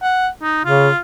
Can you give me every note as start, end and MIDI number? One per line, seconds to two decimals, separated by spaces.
0.02 0.28 78
0.42 0.64 63
0.65 0.89 49
0.65 0.99 65